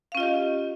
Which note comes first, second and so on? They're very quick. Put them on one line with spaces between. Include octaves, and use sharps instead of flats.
F5 C#4 F4 D#5 G4